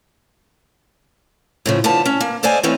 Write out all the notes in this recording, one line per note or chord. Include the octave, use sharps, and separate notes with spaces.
A2 C#3 F3
D3 F3 B3 A5
C#4
A#3
A4 C5 D5 D#5 F5 G#5
E3 A3 C4 C#4 D#4